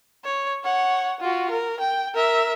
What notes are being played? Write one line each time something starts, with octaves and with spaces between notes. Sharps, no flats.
C#5
C#5 F#5
F4 F#4
A#4
G5
A#4 E5